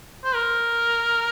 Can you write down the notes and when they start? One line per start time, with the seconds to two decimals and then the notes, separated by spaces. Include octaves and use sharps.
0.24 C5
0.34 A#4